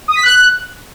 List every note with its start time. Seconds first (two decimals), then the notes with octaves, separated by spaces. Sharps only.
0.08 D#6
0.16 B6
0.23 F#6